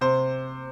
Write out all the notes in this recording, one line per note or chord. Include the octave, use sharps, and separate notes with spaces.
C3 C5